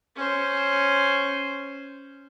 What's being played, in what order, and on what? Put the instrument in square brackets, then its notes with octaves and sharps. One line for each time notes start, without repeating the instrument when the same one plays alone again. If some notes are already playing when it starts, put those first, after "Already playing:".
[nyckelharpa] C#4 C5